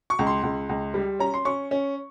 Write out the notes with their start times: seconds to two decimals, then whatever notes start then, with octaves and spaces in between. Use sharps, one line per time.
0.10 C#6
0.19 C#2
0.27 C6
0.43 C#2
0.69 C#2
0.94 G3
1.19 C#4 A#5
1.34 C6
1.45 C#4 C#6
1.71 C#4